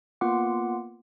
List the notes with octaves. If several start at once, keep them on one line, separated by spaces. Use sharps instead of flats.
A#3 B3 F4 F#5 C6 D6